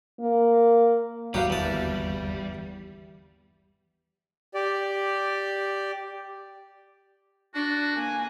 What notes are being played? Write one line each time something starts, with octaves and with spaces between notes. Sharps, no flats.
A#3
G1 D#2 F#3 G3 F#4 G4 B4 F5
E2 A5
G4 D5
D4 F#4
A#3 G#5